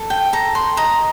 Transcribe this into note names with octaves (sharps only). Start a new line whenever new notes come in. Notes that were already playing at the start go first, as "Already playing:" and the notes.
Already playing: A4
G5
A4 A#5
C6
D#5 A#5